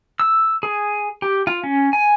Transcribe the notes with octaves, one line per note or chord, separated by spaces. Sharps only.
E6
G#4
G4
F4
C#4
G#5